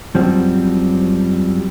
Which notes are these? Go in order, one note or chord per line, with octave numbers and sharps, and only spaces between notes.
F#2 F3 G3 C4 F#4